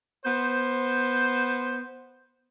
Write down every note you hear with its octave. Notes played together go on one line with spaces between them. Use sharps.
B3 C5